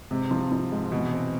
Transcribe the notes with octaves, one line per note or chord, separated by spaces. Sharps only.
G#2 C3
F3
F3
G#2
B2 E3
C4